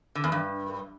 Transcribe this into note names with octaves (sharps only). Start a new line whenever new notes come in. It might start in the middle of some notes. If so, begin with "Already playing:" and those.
D3
E2
G2